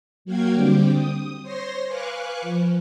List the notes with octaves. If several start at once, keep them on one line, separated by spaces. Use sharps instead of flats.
F#3 A#3 F#4 F5 G5 G#6
D3 G3 C4 G5 D6
D#6
C5 C#5 C6 A#6
B4 F5 G#5 C#6 D6 F#6
F3